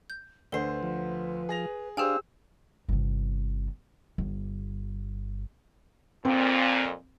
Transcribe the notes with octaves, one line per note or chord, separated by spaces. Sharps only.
G6
D2 D3 B4 C5 C7 G7
F3
G#4 A#6 F7
D4 G4 G#4 C5 F5 G5 G#5 E6
G1 C3
G1
F2 A#2 C4